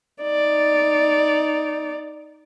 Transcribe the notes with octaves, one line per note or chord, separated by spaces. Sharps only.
D#4 D5